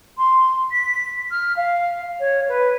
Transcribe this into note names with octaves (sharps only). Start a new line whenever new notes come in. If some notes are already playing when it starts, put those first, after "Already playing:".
C6
B6
F6
F5
C#5
B4